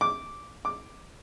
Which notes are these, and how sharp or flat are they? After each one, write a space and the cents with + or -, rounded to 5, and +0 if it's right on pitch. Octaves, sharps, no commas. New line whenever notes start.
D6 -5
D6 +5